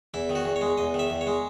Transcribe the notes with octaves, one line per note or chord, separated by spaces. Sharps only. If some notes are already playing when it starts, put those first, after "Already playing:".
E2 E4
D#3
F#4
E2
C#5
G#3
E2 D#5
D#3 E5
E2
C#5
G#3